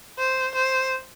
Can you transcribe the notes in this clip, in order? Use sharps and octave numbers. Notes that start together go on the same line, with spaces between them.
C5
C5